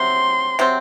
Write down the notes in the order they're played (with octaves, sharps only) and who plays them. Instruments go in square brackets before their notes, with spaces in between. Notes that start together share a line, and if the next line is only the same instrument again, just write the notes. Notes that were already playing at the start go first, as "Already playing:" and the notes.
Already playing: [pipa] C3 F#3 C4 [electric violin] C6
[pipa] C3 F#3 C4